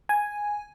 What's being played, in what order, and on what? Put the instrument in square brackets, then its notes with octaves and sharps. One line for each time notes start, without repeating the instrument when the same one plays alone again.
[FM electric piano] G#5